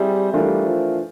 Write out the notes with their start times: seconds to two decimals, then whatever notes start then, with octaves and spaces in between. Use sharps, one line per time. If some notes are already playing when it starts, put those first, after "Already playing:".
Already playing: G3 C4 E4 G#4 C5 E5
0.33 E3 G3 A3 D4 F4 A#4
0.66 F3